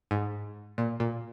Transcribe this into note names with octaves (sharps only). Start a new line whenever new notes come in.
G#2
A#2
A#2